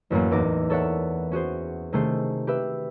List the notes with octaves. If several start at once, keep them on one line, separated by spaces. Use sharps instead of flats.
A1 F#2 F#3 A#3
A1 E2 E3 D#4 D6 A#6
A4 A#4 C#5 D5 E5 F#5
C#4 F#4 G#4 C5
C3 D#3 A3 C#4 G#4 C5
G4 B4 E5